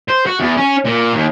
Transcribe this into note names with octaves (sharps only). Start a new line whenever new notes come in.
C5
F#4
E2
C#4
A#2
D#2